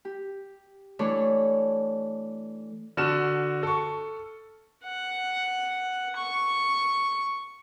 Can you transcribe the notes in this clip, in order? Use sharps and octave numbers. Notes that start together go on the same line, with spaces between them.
G4
E3 A3 D4 A4 C#5 D5
D3 F#4 F6 E7
A4 C#6
F#5
C#6